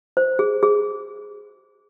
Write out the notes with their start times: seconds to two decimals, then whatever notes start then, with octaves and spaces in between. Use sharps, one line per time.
0.17 C5
0.39 G#4
0.63 G#4